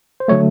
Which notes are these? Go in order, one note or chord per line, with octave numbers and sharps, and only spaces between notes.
C5
D3 F#3 A3 C#5